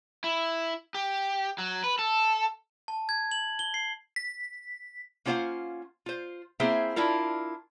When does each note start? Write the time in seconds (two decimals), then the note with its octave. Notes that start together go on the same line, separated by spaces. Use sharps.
0.24 E4
0.94 G4
1.58 F#3
1.84 B4
1.99 A4
2.88 A5
3.09 G#6
3.32 F#7
3.59 G7
3.74 C7
4.16 B6
5.26 A#3 C#4 F4 C5 F5 F#5
6.06 F4 C5
6.60 A#3 C4 E4 G#4 C5 E5
6.96 D4 E4 F4 A#4